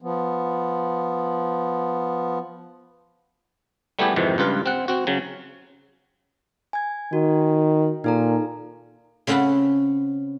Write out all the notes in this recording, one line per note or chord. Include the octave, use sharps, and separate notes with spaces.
F3 B3
G3 A3 B3 E4 G4 G#4
F2 G#2 C3 D#3 E3
C#2 G2 F4 B4
C4 F#5
C4 F#4
C#3 F#3
G#5 G#6
D#3 F#4
A#2 D#4 A4 A#5
C#3 C4 C#4 F#5 A5 B5